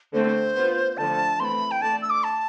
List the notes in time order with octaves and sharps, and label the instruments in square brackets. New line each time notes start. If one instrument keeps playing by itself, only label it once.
[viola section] D3 A3 C4 [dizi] C5
[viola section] B3 F4 B4
[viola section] D3 F3 A3 [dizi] A5
[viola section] E3 A3 C4 [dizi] B5 C6
[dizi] G5
[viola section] A3 D4 A4 D5 [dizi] A5
[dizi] E6
D6
A5